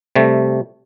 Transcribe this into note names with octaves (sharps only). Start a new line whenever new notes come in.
C3 G3 A3